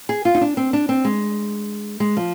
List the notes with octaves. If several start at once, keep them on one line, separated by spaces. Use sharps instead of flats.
G#4
F4
D#4
D4
C4
D4
C4
G#3
G#3
F3